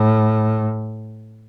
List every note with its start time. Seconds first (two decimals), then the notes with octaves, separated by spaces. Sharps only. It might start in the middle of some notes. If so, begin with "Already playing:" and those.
Already playing: A2